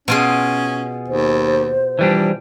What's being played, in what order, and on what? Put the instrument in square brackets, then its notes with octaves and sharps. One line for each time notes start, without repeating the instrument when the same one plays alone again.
[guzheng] B2 F4 G#4 [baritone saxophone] C#4
[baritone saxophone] D#2 [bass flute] C5
[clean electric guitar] E3 G3 D4 [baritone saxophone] F3